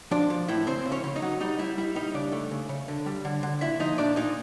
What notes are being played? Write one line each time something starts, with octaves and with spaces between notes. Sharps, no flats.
F3 D4 D5
F3
A2 E4 E5
C#3 C4 C5
C#3
C#4 C#5
C#3
D#4 D#5
F#3
G3 D#4 D#5
G3 E4 E5
G3 E4 E5
G3 D#4 D#5
C#3 D4 D5
A3
C#3
C#3
D3
G3
D3
D3
A#2 E4 E5
F3 D#4 D#5
A#2 D4 D5
A#2 D#4 D#5